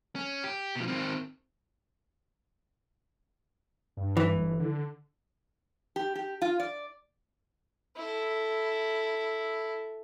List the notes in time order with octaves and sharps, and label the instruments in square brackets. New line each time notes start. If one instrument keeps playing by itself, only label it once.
[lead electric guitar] C#4
G4
B2 F3
D#3 C4
[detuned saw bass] G2
[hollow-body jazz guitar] E3
[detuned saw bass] G1
D3
[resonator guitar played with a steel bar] G4
G4
F4
D5
[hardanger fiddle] E4 A4